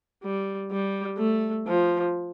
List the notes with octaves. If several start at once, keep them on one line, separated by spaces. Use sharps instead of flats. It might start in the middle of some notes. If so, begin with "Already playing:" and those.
G3
G3
A3
F3